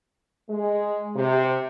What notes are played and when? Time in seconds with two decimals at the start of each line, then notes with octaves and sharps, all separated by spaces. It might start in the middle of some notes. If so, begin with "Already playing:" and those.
0.49 G#3
1.16 C3